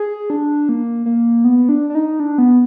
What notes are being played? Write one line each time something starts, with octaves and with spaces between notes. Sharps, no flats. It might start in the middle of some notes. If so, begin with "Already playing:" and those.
Already playing: G#4
D4
A#3
A#3
B3
D4
D4
D#4
D4
B3